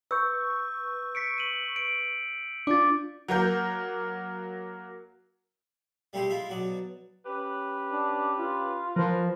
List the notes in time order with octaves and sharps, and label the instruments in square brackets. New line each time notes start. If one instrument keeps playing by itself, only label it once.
[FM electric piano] B4 C#6 [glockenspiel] E6 G6
[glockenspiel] B6 C#7 D7
D#7 F#7
D7
[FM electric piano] D4 F4 [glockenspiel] D6 A6
[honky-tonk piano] F#3 A#3 A#4 G6
[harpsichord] G3 A3 C4 E4 G4 G#4
G#3 E4 F4 E5
B2 F#3 D5
[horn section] C#4 G4 B4
[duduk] D4
F4
[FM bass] F3 [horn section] A#4 B4